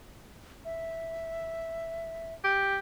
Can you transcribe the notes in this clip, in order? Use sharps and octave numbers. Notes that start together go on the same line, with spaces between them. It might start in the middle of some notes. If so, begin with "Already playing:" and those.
E5
G4